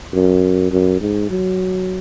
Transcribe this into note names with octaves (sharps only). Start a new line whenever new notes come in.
F#2
F#2
G#2
F#3